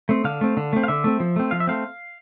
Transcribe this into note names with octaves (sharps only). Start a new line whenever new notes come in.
A3 C4
D3 F5
A3 C4
D3
A3 C4
F5
D3 E5
A3 C4
F3
A3 C4
F3 F5
E5
A3 C4 F5